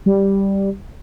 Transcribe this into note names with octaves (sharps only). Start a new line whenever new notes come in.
G3